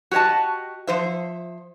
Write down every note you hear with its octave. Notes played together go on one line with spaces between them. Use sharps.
F#4 G4 C#5 D#5 A5
F3 C5 E5